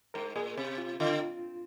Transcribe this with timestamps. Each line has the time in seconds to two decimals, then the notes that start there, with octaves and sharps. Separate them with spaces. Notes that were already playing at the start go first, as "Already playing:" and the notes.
0.14 G#2 A#4
0.36 A#2 G#4
0.57 C3
0.78 F4
1.00 D3 F4